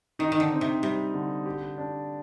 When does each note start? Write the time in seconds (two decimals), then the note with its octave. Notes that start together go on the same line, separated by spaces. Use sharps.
0.19 D#3 D#4
0.32 D#3
0.40 D3
0.52 C4
0.61 C3
0.82 C3 G3
1.14 D3
1.46 G4
1.78 D4